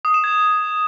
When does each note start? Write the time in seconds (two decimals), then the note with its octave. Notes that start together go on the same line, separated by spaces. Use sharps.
0.05 D#6
0.14 E7
0.24 G#6